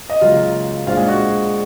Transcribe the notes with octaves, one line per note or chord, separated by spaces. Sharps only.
D#5
C#2 C#3 F#3 A#3 F4 F5
A#1 A#2 G#3 C4 F4 F5
G#3 G#4
F#4